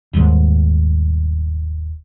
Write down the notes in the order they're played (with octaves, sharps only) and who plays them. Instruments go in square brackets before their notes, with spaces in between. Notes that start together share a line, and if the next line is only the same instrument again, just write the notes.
[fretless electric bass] D#1 D#2 G#2